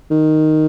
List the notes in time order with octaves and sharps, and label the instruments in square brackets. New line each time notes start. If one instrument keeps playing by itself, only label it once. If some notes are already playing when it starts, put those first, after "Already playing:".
[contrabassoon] D#3